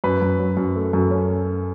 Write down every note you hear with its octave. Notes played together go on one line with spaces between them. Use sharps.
F#2 B4
F#2
F#3
F#2
A3
F#2
C#4